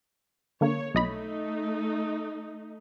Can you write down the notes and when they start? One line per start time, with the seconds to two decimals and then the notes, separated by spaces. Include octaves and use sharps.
0.61 D3 A#3 C#5
0.95 B1 A3 D#4 D#5 B5